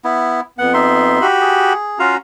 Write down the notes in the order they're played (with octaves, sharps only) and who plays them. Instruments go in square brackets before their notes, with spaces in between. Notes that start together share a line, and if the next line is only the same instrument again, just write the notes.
[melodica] B3 E4
[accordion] F2 B3 [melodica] F#5
[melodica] D#4 E5 C6
[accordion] F#4 G4 B5
[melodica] G#4
[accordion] C#4 F#4 A#5 [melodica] F4 F5